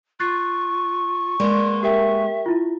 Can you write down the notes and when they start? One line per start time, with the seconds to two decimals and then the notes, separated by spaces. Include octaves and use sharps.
0.20 F4 C#6 F#6 A6 C7
1.40 G#3 A#3 B3 D5 C6
1.83 G4 A#4 E5 G5
2.46 E4 F4